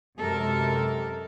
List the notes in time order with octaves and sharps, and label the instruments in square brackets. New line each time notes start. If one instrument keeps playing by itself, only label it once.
[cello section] F#2 C3 F#3 G#3 A4 A#4